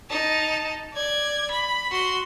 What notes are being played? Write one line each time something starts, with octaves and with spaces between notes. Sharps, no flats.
D#4 A5
D5 G#6
B5
F#4 C6